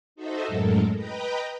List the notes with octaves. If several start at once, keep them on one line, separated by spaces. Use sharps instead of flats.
D#4 F#4 A4 C5 D#5 E5
F#2 A2 F#3 G#3 A4 A#4
B4 D#5 G5 A#5 B5